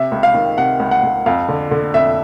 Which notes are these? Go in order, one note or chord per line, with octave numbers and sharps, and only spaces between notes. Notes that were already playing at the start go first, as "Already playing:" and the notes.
Already playing: C3 E5
C#2
F5
D#3
C3 F#5
C#2
F#5
C#2
F2 F5
D3
D3
F2 E5